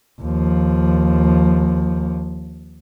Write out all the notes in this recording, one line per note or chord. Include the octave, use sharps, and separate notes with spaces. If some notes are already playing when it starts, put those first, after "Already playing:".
D#2 F3